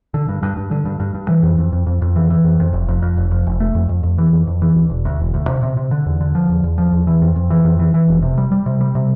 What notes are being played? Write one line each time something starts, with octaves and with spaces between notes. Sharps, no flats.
D3
G2
G2
G2
D3
G2
G2
G2
E3
F2
F2
F2
F2
F2
E3
E3
F2
F2
F1
F2
F2
F1
F2
F1
A3
F2
F2
F2
E3
F2
F2
E3
D2
E1
D2
E1
D2
C3
C3
C3
D3
E2
D3
F3
E2
E2
F3
E2
E3
F2
F2
E3
F2
E3
E3
F1
C3
G3
G3
C3
G3
C3